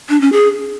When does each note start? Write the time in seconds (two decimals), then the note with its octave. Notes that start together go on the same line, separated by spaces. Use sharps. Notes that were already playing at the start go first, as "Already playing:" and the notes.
0.09 D4
0.21 C#4
0.33 G#4